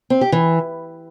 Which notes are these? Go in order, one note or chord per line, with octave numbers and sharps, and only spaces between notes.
C4
G4
E3